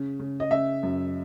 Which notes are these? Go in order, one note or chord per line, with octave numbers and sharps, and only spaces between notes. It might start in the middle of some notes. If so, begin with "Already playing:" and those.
Already playing: C#3
C#3
D#5
C#3 E5
F#2